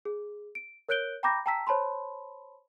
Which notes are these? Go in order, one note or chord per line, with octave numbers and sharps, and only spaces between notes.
G#4
D7
A#4 C#5 F#6 G6 D7 G7
G5 A#5 B5 D6 G6 A#6
G5 A5 A#5 E6 B6
C5 C#5 A5 B5 C6